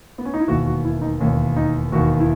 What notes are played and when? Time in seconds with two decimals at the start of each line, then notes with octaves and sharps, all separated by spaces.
0.18 B3
0.25 C#4
0.34 D#4
0.40 E4
0.48 E1 D#2 D#3 F#4
0.66 F#4
0.85 E4
1.02 D#4
1.20 E1 D#2 D#3 C#4
1.57 D#4
1.92 E1 D#2 D#3 F#4
2.20 E4